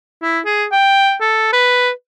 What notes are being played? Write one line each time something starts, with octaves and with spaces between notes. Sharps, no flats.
E4
G#4
G5
A4
B4